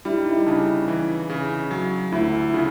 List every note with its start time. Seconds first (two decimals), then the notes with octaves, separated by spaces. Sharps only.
0.05 G3 E4
0.17 D#4
0.30 E4
0.46 C#3 D4
0.88 E3
1.30 C#3
1.71 F#3
2.12 D2 E4
2.53 C#3 E4